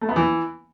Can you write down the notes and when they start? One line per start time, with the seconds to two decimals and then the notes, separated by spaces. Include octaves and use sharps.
0.01 A3
0.09 B3
0.16 E3